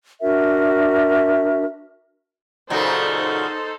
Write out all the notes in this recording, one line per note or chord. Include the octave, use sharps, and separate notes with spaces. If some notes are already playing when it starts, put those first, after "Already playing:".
D4 F#4 A#4 E5
A#2 C#3 F#3 D#4 A4 C5